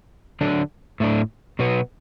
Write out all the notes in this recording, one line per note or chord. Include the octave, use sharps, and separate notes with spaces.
D3 F#3 D4
A2 A3 D4
B2 F#3 B3